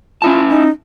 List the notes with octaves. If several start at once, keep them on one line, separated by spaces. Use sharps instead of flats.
C#4 E4 F4 A5
D#4